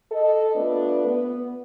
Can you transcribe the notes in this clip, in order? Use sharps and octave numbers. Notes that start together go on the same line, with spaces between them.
A4 D#5
A3 B3 D4 F4 B4
B3